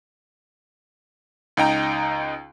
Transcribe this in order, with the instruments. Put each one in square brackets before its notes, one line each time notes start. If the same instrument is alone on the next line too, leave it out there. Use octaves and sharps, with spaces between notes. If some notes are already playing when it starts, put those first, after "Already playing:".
[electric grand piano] C#2 D#4 G5 A#5